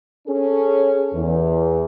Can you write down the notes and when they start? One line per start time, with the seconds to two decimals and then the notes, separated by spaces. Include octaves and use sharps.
0.28 C#4 G#4 A4
1.14 E2